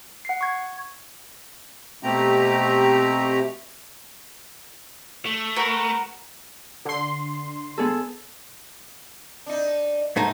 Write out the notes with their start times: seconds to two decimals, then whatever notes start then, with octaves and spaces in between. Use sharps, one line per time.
0.25 F#5 C7
0.41 C#6 G#6
2.03 B2 A3 C4 G4 A#5
5.26 A3
5.56 F#4 A#4 B4
6.85 D3 C6
7.78 B3 G#4 A4
9.46 D4 D#4
10.16 G#2 A3 D#4